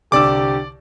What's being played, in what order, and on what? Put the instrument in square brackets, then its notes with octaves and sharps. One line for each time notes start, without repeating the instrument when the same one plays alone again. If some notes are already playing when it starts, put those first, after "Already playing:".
[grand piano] C2 D3 E6 [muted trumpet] G4 [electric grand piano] D5 D6